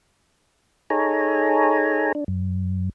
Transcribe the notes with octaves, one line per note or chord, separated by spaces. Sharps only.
D#4 G#4 A4 C#5 G#5 A#5
D4
F#2